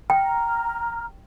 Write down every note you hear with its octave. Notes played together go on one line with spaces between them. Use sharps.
G5 A#5 F6